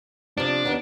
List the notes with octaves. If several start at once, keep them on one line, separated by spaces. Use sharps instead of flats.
C3 F3 D4
D#2 B3